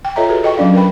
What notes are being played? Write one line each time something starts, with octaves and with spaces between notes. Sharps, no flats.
G5
F4 A4 C#5 D#5 E5 A#5
F#4 G#4 A4 B4
A4 D#5 G5 C#6
F#3 C#4 D4 D5 F5
A#4 B4 G5 B5